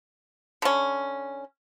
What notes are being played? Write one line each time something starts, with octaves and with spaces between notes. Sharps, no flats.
D3 C#4